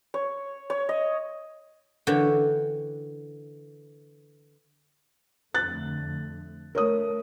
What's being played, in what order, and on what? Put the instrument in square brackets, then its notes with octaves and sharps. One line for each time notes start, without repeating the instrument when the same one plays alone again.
[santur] C#5
C#5
D#5
[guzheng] D3 E3 C#5 G5
[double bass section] F2 D3 A3 [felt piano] F#6 A6
[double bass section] A3 [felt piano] A#4 C#5 D#6